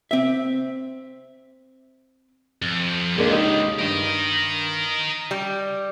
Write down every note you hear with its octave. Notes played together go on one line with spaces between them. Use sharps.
C4 E5
F2
C#2 G#3 A#3 D4
D#4 G4
G2 A#4 D#5
G3